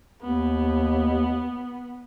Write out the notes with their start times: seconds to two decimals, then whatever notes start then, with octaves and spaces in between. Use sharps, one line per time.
0.22 D#2 B3